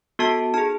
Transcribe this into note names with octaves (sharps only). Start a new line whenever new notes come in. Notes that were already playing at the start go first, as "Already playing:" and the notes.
B3 F#4 A4 A5
D#4 G#4 A5